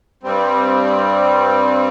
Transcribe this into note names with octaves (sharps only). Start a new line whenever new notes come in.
G2 G3 C4